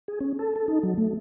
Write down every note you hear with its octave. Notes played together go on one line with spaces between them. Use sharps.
G#4
C#4
A4
A4
D#4
F#3
A3